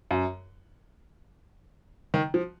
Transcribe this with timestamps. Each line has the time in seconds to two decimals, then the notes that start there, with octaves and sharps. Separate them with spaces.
0.11 F#2
2.14 D#3
2.34 F3